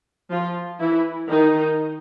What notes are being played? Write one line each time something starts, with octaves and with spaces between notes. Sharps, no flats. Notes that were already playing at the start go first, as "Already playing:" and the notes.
F3 F4
E3 E4
D#3 D#4